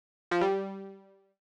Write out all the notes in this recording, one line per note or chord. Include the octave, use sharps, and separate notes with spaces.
F3
G3